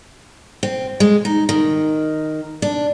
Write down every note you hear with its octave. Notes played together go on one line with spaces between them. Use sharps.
C4
G#3
D#4
D#3
D4